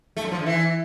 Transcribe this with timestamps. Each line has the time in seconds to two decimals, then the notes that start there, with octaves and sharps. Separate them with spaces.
0.17 A3
0.24 F#2
0.31 F3
0.39 D3
0.46 E3